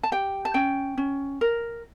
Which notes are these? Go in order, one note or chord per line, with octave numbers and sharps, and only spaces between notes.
A5
G4 G5
A5
C#4 G5
C#4
A#4